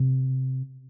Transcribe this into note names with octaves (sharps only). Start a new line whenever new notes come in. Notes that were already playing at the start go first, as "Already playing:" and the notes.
Already playing: C3